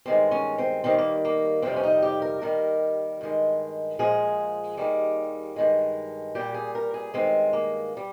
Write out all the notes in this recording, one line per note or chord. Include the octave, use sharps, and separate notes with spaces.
G2 D#3 G#3 C4
C#4
C4
D#2 D#3 G3 C4
A#3
A#3
F2 C3 D#3 G3 C4
C#4
D#4
G4
A#4
D#2 D#3 G3 A#4
G2 D#3 G#3
A#2 F3 G#3 G#4
D#2 D#3 G3
G2 D#3 G#3
A#2 G3 G4
G#4
A#4
G#4
G2 D#3 G#3 C4
A#3
G3